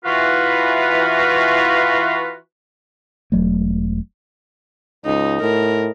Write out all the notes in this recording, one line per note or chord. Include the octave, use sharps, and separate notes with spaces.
E3 F4 F#4 B4
E1 F#3 A3
C#2 D#4
A2 A#4